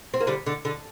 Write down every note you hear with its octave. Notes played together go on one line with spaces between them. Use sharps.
C4
A#3
D3 G3
D3
D3